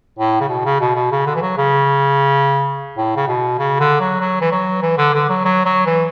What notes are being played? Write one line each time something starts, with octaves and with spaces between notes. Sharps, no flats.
A2
C#3
B2
C#3
B2
B2
C#3
D3
E3
F#3
C#3
A2
C#3
B2
C#3
D3
F#3
F#3
E3
F#3
E3
D3
D3
F#3
F#3
F#3
E3